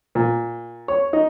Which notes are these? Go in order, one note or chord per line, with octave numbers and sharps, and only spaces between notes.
A#2
C#5
D#4